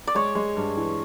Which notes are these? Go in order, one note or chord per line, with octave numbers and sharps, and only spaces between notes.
D5
G#3 C#5
G#3
G2
E3